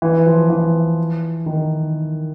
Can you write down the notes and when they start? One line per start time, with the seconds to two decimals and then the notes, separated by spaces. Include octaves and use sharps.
0.02 E3
0.27 F3
0.50 E3
1.46 D#3